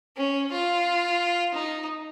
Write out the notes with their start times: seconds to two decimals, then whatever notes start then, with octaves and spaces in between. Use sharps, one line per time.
0.17 C#4
0.52 F4
1.54 D#4